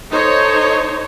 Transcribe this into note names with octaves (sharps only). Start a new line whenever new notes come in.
D#4 A4 C5 C#5